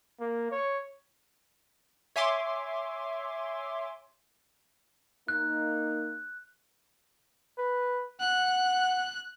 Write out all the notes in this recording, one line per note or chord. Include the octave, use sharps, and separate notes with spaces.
A#3
C#5
C#5 E5 G#5 C6 D6
A#3 D#4 F#6
B4
F#5 F#6